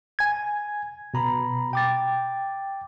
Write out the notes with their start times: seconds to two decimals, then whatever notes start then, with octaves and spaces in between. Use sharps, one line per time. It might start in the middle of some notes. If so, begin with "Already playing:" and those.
0.19 G#5 G#6
1.14 B2 A#5 B5
1.73 G5 D6 A6